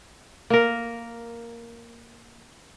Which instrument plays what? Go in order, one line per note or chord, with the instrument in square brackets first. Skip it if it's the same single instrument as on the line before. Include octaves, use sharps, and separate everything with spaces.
[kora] A#3 A#4